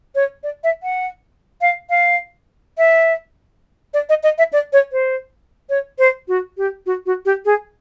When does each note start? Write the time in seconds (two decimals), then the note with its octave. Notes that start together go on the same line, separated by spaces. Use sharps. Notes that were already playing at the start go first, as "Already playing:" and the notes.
0.15 C#5
0.43 D5
0.64 E5
0.83 F#5
1.61 F5
1.90 F5
2.78 E5
3.94 D5
4.09 D#5
4.23 D#5
4.38 E5
4.53 D5
4.73 C#5
4.92 C5
5.69 C#5
5.99 C5
6.28 F#4
6.57 G4
6.86 F#4
7.06 F#4
7.25 G4
7.45 G#4